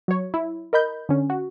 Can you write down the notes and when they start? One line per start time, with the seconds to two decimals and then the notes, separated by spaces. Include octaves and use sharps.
0.08 F#3 C#5
0.34 E4
0.73 A#4 D#5 B5 G6
1.09 D3 C#4
1.30 F#4